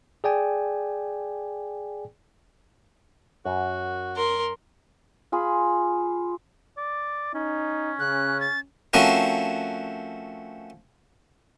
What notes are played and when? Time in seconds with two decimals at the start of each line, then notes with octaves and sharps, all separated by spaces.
0.24 G#4 D5 G5 G#5
3.45 F#2 F#4
4.16 A#4 C6
5.32 F4 G#4 B5
6.77 D5
7.34 C#4 D#4
7.99 C#3 F#6
8.40 A6
8.93 F3 A3 C4 C#4 F#4 A#4